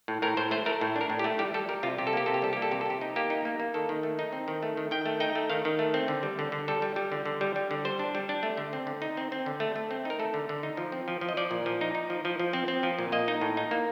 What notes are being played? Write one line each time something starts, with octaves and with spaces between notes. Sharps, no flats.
A2
A2 A#4
A2 C5
A3 C5
A3 A#4
A2
D4
A#4
A2
G4
A3
G3 G4
G3 A4
G3 A#4
C3 F4
C3 G4
A4
A#3 G4
C3 A4
G4
G3 A4
A#3 G4
A4
C3 G4
A4
C3 G4
D#4
A#3 G4
D#4
A#3
A#3
D#3 A4
D#3
A3
D#4
C4
D#3
A3
D#3
D#3 G5
A3
D#4 G5
A3
D#3 F5
D#3
A3
C4
D3
G3
D3
D3
G3 A4
G3
G3
D3
D3
G3
G3
D3
G3 C5
D4
G3
D4
A3
D3
C4
D3
D#4
C4
C4
D3
A3
A3
C4
D#4 A#4
A3 A4
D3
D3
D#4
F3
C4
F3
F3
D#5
F3 D5
A#2
F3
D#4
D#4
F3
F3
F3
C4
C4
F3
A#2
A#3 D#5
D#4
A2
D#4
A#3